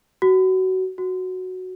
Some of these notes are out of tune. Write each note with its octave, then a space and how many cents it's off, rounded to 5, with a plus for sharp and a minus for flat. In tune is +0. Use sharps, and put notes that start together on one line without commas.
F#4 +20
F#4 +0